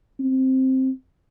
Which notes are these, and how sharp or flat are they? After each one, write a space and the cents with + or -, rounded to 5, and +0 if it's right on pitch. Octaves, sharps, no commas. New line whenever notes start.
C4 +5